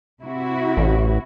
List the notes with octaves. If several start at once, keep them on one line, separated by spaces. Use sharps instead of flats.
C3 E4 F#4
A1